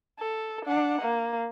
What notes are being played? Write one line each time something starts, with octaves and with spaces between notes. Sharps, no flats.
A4
D4 F#5
A#3